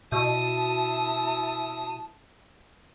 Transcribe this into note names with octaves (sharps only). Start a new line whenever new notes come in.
B2 E4 A5 D#6